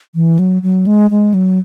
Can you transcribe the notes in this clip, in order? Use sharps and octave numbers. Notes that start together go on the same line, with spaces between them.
E3
F#3
F#3
G#3
G#3
F#3